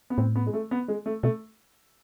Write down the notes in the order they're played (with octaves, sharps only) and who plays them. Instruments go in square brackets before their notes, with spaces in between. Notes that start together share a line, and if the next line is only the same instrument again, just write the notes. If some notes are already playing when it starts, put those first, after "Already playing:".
[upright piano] B3
[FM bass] A2 [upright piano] C4
[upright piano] B3
G#3
A3
B3
G#3
A3
[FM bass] B2 [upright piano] A3